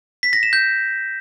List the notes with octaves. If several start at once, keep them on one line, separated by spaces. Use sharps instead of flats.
B6
A#6
E7
G6